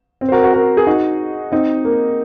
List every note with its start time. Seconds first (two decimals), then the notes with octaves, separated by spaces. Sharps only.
0.21 C4
0.29 C5
0.32 F#4 A#4
0.43 F#4 A#4
0.54 F#4 A#4
0.77 G#4
0.87 D#4 F#4
1.52 C4 D#4
1.84 A#3